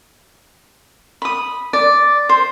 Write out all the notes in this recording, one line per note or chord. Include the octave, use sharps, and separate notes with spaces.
B5 D#6
D5
C5